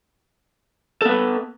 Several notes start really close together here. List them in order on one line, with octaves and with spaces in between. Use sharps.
A4 B3 B4